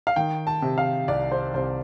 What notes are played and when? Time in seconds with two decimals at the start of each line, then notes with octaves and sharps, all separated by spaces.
0.07 F5
0.16 D#3 G5
0.47 A5
0.62 C3
0.78 F5
1.08 C2 D5
1.31 C5
1.54 C2 C5